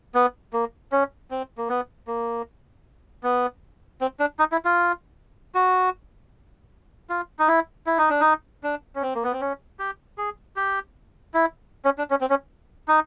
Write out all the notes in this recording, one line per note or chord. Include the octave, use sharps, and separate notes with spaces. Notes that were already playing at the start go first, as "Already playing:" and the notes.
B3
A#3
C#4
C4
A#3
B3
A#3
B3
C4
D4
D#4
E4
F4
F#4
F4
D#4
E4
E4
D#4
D4
D#4
D4
C#4
C4
A#3
B3
C4
C#4
G4
G#4
G4
E4
C#4
D4
C#4
C4
C#4
D#4